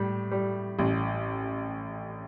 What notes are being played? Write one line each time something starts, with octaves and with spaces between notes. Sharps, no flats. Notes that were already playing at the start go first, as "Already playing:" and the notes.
Already playing: A2 G3
G3
A1